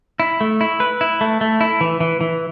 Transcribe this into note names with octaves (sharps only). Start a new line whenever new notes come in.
E4
A3
E4
B4
E4
A3
A3
E4
E3
E3
E3